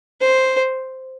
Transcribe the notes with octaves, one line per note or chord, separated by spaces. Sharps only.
C5